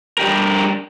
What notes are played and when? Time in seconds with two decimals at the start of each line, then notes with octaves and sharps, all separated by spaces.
0.18 G3 D4 G4 A#4